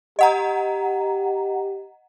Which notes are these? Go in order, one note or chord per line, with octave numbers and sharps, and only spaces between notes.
G4 D#5 F#5 A#5